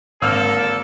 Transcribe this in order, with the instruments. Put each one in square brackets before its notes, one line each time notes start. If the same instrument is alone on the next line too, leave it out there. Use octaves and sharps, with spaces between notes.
[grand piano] G#1 E6 F6 [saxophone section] D3 A#3 [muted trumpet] A4